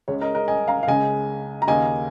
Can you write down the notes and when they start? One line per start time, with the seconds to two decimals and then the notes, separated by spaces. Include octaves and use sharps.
0.08 C#2 C#3 G#3 C#5
0.21 A#4 D#5
0.35 A#4 D#5
0.48 D#5 G#5
0.68 F5 A#5
0.83 F5
0.87 C#2 C#3 G#3 D#5 G#5
1.62 A#5
1.67 D#2 C#3 A#3 D#5 G#5